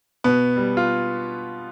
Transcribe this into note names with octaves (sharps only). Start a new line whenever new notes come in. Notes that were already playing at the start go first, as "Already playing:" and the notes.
B2 B3
G3
F4